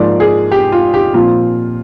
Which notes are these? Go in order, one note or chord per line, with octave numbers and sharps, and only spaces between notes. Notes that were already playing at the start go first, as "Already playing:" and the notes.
Already playing: G#2 F3 A#3 F4 D5
G#4
G4
F4
G4
A#2 F3 C4 F4